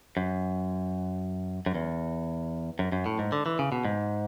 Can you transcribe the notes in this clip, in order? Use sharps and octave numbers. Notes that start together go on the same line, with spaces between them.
F#2
F#2
E2
F#2
F#2
A2
G#2
D3
E3
C#3
B2
G#2